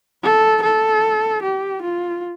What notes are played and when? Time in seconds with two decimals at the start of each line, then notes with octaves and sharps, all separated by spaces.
0.23 A4
0.62 A4
1.42 G4
1.82 F4